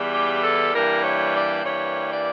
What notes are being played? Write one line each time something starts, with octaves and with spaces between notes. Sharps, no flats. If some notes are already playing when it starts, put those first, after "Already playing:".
Already playing: E2 E3 G3
G4
A4
G2 E3 G3 A#3 A#4
C#5
D5
G2 E3 G3 A#3 C#5
D5